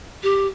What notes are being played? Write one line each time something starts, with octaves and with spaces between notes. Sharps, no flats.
G4